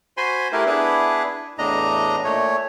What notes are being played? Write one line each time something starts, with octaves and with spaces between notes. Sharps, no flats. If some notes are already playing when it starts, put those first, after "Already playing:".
F#4 C5 G#5 B5 C6
A3 E4 G4 A#4 B4
B3 D4 E4 G#4 B4
E2 A2 D4 D#5 A#5
A#2 A3 C#5